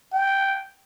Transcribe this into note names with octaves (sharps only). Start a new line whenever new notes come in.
G5